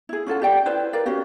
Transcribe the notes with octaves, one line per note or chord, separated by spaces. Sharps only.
E4 G#4
C#4 F4 A4 F#5
G4 D5 G5
E4 B4 C5 D5
A#4 B4 D5 F5
C#4 F#4 G4 F5